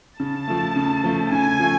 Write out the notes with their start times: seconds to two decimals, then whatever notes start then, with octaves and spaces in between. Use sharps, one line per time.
0.20 C#3 A5
0.48 F3 A3
0.76 C#3
1.04 F3 A3
1.32 C#3 G#5
1.60 F3 A3